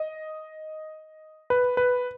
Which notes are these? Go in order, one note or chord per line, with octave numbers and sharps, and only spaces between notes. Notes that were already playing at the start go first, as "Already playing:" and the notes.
Already playing: D#5
B4
B4